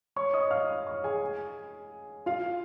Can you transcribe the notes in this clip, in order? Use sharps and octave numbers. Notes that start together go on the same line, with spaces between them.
C#5 C#6
D#5 D#6
F5 F6
C#5 C#6
G#4 G#5
F4 F5